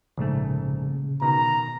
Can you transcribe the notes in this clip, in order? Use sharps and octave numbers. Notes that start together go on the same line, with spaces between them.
A#1 G#2 C#3 A3
B2 D#3 A#5